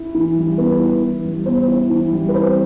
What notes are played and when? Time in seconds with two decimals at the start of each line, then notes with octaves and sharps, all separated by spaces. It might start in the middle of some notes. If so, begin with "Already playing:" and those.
Already playing: E4
0.15 E3
0.37 G3
0.58 B3 B4
0.80 E4
1.03 E3
1.24 G3
1.46 B3 C5
1.68 E4
1.90 E3
2.12 G3
2.29 B4
2.33 C4 C5